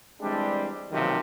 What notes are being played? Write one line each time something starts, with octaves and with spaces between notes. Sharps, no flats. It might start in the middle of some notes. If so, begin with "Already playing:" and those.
E3 G3 G#3 C4 D4
B1 C3 D#3 F3 F#3 A#3